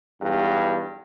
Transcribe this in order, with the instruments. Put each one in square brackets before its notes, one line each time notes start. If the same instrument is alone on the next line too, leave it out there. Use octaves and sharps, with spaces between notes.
[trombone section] B1 E2 G2